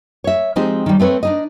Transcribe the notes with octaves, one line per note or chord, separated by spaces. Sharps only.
C#5 E5
F3 G#3 C4 D#4 G4 C5
D#3 G3
A3 C4 B4 C#5
D4 D#4 D#5